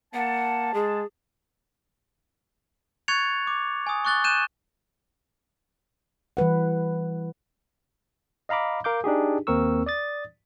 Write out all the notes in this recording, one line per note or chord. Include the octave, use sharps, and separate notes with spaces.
A#3 F#5 A5
G#3 G#4
C#6 F#6 G#6 A6 C#7 F7
D6
G#5 D#6
C#6 D6 F#6 A6 G7
F#6 G6 D#7 E7
E3 G3 B4 F#5
D#5 F5 A#5 B5 D6
A#4 F5 D6 G6
D4 D#4 G4 G#4
D#2 A#3 C4 A#4 C#6 E6
D5 D#6 A6